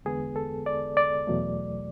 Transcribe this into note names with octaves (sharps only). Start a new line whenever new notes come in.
E2 D3 G#3 B3 G#4
A4
D5
D5
E2 B2 F#3 A3